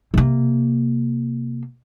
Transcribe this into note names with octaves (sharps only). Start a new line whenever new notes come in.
C3 A#3